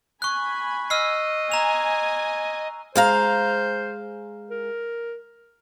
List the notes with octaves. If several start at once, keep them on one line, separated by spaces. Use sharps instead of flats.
G#5 B5 C#6 F#6
D#5 E6 F6 C7
G#5 A#5 F7
G#3 C5 F5 A#5
A#4